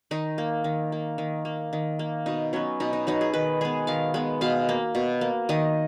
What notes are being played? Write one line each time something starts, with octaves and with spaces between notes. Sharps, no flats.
D#3 D#4
A#3
D#3
A#3
D#3
A#3
D#3
A#3
B2 D#4
F#3 B3 C#4
B2 D#4
D#4
F#3 B3 D#4
G#4
D#3 B4
G#3 B3 G#4
D#3 F5
G#3 B3
B2 F5
A#3
B2
A#3
D#3 D#5